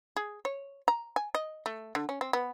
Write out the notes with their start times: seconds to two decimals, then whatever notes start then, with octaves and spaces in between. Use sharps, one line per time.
0.16 G#4
0.45 C#5
0.88 A#5
1.16 G#5
1.35 D#5
1.66 A3
1.95 D3
2.09 C#4
2.21 C4
2.33 B3